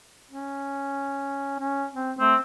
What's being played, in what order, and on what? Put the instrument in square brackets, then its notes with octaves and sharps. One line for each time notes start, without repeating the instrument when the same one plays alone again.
[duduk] C#4
C#4
C4
[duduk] A3 [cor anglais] C4